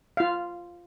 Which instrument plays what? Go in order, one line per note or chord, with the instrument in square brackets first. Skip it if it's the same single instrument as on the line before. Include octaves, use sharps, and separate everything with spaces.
[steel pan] F4 F5